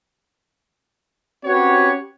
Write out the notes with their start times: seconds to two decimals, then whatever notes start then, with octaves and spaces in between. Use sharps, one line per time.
1.45 C4 C#4 F#4 G4 B4 C#5